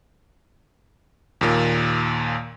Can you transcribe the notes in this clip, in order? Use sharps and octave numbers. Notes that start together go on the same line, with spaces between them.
D#2 A#2 A#3